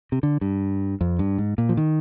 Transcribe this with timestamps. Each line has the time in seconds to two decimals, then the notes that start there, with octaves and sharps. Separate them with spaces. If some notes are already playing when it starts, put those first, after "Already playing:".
0.12 C3
0.23 D3
0.41 G2
1.01 F2
1.19 G2
1.38 G#2
1.58 A#2
1.69 F3
1.77 D#3